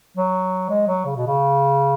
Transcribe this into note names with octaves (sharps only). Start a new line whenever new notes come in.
F#3
G#3
F#3
C#3
B2
C#3